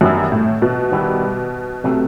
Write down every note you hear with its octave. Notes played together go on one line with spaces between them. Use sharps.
F#2 D#3 G3 B3 E4
A2
B2
D#3 G3 B3 E4
C3 F#3 A3